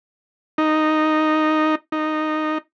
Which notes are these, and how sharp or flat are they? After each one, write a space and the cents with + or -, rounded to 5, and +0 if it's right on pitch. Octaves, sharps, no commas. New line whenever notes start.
D#4 -5
D#4 -10